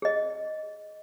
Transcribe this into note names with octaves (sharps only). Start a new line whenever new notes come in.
G#4 D#5